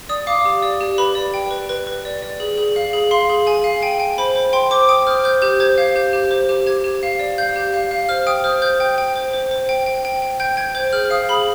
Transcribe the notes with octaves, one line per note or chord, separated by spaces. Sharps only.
D5 D#6
F5 D6
G4
D5
G4
B4 B5
D5
G5
B4
B4
B4
D5
D5
G#4
G#4
F5
G#4
F5 C6
G#4
G#4 G#5
F5
G5 G#5
G5
C5 B5
C5
G5 C6
C5 D6
G5 D#6
C5 F6
C5 G6
G4 G6
C5 G#6
F5 G6
G4 G6
G4
C5
G4
G4 G#6
G4
F5
D5
F5 G6
G4
F5
F5
C5 F6
G5 D#6
C5 F6
C5 G6
G5
G5
C5
C5
C5
G5
G5
G5
G5
G5 G6
G5 G#6
C5 G6
G#4 F6
F5 D#6
G#4 B5